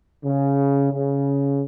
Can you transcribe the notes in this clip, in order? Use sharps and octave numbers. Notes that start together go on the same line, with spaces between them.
C#3
C#3